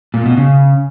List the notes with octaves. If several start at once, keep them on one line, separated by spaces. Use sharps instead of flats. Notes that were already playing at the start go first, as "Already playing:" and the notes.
A#2
B2
C#3